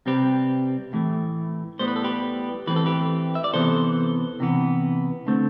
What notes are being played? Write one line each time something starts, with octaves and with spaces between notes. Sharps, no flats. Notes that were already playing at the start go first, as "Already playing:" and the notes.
C3 G3 C4 G4 B4
A2 E3 A3
A2 G3 B3 C5
B4
A4
G4 B4
A2 E3 A3 C4 B4
A4
G4 B4
E5
D5
C3 E3 B3 A4 C5
C3 E3 B3
D3 A3 C4